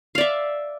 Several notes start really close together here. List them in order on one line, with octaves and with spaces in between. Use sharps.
F5 D5 E5